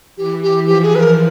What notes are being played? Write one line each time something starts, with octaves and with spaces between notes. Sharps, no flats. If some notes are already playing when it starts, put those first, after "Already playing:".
E3 G4
G4
F3 G4
G#4
B4
A#4